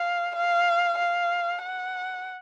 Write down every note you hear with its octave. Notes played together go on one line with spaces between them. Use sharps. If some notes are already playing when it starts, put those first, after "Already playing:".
Already playing: F5
F5
F5
F#5